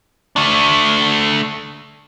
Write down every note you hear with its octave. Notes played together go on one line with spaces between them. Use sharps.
A3 D4